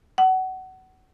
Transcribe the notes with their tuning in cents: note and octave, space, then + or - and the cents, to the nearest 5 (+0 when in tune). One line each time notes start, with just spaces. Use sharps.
F#5 +25